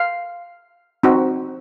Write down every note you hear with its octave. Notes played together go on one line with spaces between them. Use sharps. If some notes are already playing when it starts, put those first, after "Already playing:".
Already playing: F5
C4 D#4 F#4